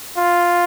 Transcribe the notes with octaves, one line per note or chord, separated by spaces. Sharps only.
F4